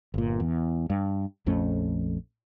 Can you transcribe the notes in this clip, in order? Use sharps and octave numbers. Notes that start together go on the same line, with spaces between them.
G1 A#2
E2
G2
A#1 F2 A3 C#4